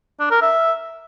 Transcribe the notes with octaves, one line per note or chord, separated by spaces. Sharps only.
D4
A#4
E5